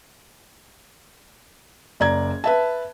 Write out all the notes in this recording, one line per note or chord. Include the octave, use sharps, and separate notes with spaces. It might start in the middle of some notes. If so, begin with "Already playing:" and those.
F#1 D5 A#5 G#6
B4 E5 A5